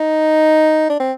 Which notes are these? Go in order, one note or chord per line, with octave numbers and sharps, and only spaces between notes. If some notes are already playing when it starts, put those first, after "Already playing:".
Already playing: D#4
D4
C4